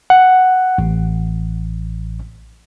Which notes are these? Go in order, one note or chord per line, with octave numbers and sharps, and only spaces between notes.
F#5
A1